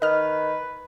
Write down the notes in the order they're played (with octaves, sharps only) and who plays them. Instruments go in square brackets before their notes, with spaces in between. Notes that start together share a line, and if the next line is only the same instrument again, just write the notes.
[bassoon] D#3 [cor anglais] B4 [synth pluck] D#5 F6